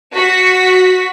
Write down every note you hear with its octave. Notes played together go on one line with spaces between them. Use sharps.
F#4 B6